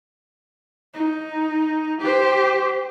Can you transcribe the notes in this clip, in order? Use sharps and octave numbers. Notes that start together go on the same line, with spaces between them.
D#4
G4 C5